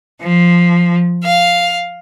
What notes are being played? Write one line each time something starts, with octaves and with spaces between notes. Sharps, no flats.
F3
F5